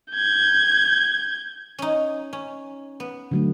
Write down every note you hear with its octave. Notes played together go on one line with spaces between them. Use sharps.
G6 G#6
C#4 D#4
C#4
B3
D3 F#3 A3